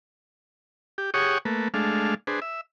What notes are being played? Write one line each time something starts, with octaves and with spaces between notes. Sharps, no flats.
G4
G4 G#4 C#5 F#5 C#6 D#6
A3 A#3 B4
G#3 A3 D4 F5
D4 G#4 B4 C5
E5